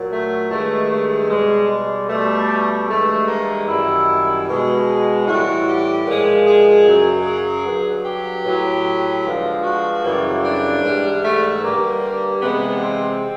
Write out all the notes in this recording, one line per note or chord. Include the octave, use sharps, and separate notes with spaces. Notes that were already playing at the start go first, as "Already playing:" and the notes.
Already playing: A#2 F#3
A3
G2 D#3 G#3 A3
A3
B2 G3 G#3
G#3
B2 G3 A3
G2 E3 G#3 A3
A#3
F#2 D#3 G3 E4
B2 G#3
A2 E3 G3 F#4
G4
A#2 F3 G#3
G#4
F#2 C#3 F#3
G#4
G2 D3 F#3
G4
A2 F#3
G2 D3 F3 G#3
F#4
F#2 C#3 E3 G3
D4
G#2 E3 G3
A3
G2 D3 G3 A#3
C3 E3 G#3 B3
C4